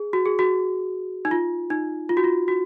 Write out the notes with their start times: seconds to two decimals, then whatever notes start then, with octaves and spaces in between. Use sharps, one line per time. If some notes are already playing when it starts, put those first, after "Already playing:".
Already playing: G#4
0.13 F#4
0.25 G#4
0.39 F#4
1.25 D#4
1.31 F4
1.70 D#4
2.09 F4
2.17 F#4
2.24 F4
2.48 F#4